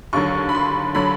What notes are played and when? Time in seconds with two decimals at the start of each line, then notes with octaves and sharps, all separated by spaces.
0.13 D#2 D3 F#3 C#6
0.49 B5
0.55 C6
0.95 D3 F#3 B5